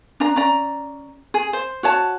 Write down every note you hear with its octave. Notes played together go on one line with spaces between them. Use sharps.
D4 A#5
C#4 D5 A#5
G#4
C5
F#4 C#5 A5